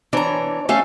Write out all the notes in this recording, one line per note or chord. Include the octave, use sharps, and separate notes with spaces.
E3 D4 C#5 A#5
A3 C#4 A4 F5 G#5